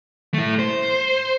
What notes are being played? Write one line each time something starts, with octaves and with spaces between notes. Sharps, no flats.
A3 E4
C5